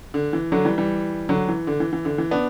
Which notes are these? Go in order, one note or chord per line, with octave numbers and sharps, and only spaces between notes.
D3
E3
D3 F#3
E3 G3
E3 G3
D3 F#3
E3
D3
E3
E3
D3
E3
B3 D4